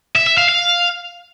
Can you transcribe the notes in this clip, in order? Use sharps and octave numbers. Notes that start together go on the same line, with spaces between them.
E5
E5
F5
F5